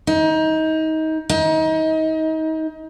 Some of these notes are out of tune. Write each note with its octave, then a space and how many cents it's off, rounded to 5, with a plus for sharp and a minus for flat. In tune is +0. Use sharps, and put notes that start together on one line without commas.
D#4 +25
D#4 +30